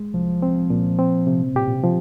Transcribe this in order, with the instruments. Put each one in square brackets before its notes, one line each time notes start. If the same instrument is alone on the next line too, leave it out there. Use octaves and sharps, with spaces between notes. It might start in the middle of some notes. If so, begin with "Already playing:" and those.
Already playing: [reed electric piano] G#3
[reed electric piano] C2 [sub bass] F3
[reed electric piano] C4
A#2
C4
C3
[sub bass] A#2 [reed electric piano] G4
[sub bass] A#2
C3
[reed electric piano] F3